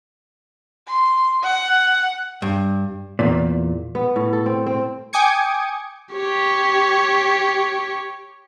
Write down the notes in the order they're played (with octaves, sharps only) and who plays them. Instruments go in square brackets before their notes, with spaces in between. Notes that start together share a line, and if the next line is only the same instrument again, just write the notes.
[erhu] C6
F#5
[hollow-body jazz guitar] G2
E2 A#2
[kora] B3
A2
A4
C4
C4
[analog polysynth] G5 G#5 D6 D#6 G#6 C#7
[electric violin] G4 C#5